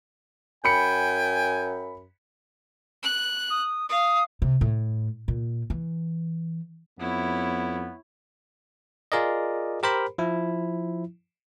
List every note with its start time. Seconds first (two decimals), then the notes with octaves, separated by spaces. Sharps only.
0.65 F#2 G5 G#5 B5 C#7
3.03 F#6
3.50 D#6
3.89 F5 D#6
4.42 C3
4.61 A2
5.28 A#2
5.70 E3
7.00 F2 B3 E4 C#5
9.12 F4 G#4 A#4 D5 D#5
9.83 G4 A#4 C5 B5
10.18 F3 E4